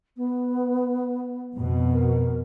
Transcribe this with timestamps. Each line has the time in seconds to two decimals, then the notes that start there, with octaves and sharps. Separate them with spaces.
0.17 B3
1.55 F2 B2
1.93 A#4